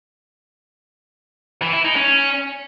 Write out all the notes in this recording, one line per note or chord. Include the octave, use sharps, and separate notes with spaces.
E3
E4
D#4
C#4